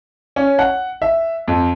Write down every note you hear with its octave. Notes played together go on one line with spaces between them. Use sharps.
C#4
F#5
E5
F2